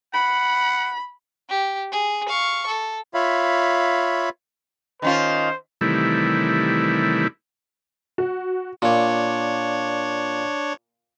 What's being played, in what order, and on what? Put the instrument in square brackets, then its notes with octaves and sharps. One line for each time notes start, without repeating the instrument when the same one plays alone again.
[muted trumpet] F#5 [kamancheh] B5
[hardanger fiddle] G4
G#4
F5 C#6
A4
[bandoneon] F4 C#5 E5 F5 B5
[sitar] D#3 C#4 F4 [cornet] C5
[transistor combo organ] C3 D#3 E3 G3 A3 E4
[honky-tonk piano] F#4
[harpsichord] A#2 [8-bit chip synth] D4 C#5